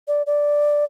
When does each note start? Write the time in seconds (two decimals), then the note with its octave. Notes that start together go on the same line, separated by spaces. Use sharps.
0.08 D5
0.27 D5